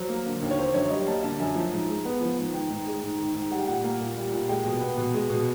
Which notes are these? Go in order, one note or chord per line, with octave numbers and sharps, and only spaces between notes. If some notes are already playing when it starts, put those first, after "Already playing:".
Already playing: F#3 C5
A#3
D3
D#2
C#5
D3 C5
F#2 C#5
G3 D#5
A#3 A5
D3 A5
F#2 G#5
F3
G#2
G#3
B3
F3
G#2
D#3 G5
G#2
G#3
G#2
D#3
G#2
G3 F#5
G5
A#2 F#5
A#3
A#2
G3
A#2
G#3 G5
B2
B3
B2
G#3
B2